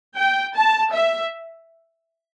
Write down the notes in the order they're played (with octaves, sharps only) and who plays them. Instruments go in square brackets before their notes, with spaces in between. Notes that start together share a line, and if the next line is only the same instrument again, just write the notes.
[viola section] G5
A5
E5